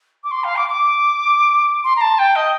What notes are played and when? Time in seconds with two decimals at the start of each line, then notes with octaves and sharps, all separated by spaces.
0.24 D6
0.31 C6
0.44 F5
0.56 D6
0.69 D6
1.84 C6
1.96 A#5
2.01 A5
2.19 G5
2.36 D#5